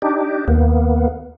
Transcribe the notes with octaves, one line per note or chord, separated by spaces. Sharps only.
D4 D#4 G4
D#2 A#3 B3